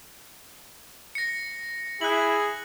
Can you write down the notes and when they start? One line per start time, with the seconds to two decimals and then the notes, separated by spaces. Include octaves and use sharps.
1.15 A#6 C#7
2.01 E4 G#4 F#6 F#7